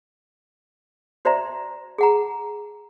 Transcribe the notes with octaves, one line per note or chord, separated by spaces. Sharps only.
F#4 C5 D5 E5 A#5
G#4 F#5 A#5